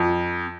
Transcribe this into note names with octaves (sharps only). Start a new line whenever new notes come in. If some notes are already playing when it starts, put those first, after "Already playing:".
Already playing: F2